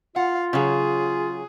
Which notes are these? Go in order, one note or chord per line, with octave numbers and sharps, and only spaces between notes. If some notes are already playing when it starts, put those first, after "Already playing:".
F4 F5 F#5
C#3 F#3 G#4